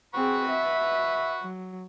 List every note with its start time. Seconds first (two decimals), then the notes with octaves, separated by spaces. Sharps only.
0.15 C4 G#4 F#5 B5 C#6
0.49 E5
1.41 F#3